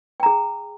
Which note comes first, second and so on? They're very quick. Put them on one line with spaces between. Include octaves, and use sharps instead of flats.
G5 A#5 G#4